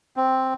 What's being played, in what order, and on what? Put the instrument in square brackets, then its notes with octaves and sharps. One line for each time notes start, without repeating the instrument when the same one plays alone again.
[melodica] C4